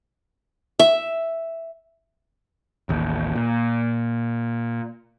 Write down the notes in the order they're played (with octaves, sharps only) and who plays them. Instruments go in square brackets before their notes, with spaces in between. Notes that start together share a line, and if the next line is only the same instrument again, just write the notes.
[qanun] E5
[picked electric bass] A1 D#2
A#2